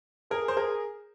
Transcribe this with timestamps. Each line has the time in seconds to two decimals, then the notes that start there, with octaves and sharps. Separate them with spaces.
0.30 G#4 A#4
0.48 C5
0.57 G#4 A#4